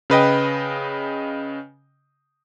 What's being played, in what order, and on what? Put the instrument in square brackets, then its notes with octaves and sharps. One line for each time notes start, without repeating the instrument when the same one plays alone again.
[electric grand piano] C#3 B4 D#5 G5